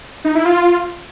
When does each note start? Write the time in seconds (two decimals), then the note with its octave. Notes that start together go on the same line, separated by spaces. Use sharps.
0.25 D#4
0.35 E4
0.45 F4